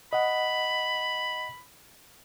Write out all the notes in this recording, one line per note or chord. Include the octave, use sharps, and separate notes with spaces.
D#5 F#5 B5